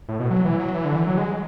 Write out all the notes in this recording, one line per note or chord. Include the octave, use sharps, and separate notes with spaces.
A2
B2
F#3
E3
F#3
E3
D3
E3
F#3
G#3